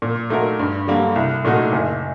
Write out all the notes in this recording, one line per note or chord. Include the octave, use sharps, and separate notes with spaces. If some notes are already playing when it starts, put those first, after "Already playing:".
A#2
A3 D#4 F#4 A#4
G2
D3 G3 A#3
C2
A#2 A3 D#4 F#4
F#1